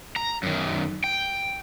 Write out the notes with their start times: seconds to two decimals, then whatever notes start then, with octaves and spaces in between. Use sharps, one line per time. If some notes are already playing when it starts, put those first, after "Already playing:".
0.16 A#5
0.43 F#2 D#3
1.04 G5